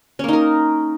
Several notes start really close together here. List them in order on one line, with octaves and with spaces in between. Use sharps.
C#4 A#3 D#4 A#4